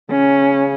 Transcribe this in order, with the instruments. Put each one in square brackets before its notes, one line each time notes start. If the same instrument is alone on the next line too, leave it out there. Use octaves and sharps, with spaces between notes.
[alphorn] C#3 [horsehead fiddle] C#4